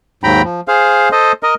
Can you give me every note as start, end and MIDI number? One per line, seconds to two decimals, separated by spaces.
0.24 0.42 39
0.24 0.42 44
0.24 0.42 54
0.24 0.42 79
0.24 0.42 82
0.24 0.42 83
0.44 0.61 53
0.68 1.09 68
0.68 1.09 72
0.68 1.09 77
1.12 1.32 69
1.12 1.32 72
1.12 1.32 75
1.43 1.55 70
1.43 1.55 75